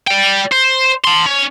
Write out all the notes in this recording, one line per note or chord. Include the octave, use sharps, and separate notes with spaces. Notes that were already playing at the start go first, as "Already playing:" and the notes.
D5 G5
C5
A5 C6
C#4